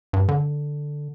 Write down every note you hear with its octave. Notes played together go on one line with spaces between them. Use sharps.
G2
D3